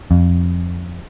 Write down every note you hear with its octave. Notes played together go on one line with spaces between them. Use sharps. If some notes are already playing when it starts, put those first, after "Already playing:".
F2